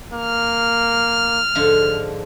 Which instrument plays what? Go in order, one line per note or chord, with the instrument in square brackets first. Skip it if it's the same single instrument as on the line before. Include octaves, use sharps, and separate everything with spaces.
[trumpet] A#3 [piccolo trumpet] F6
[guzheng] G#2 D3 F3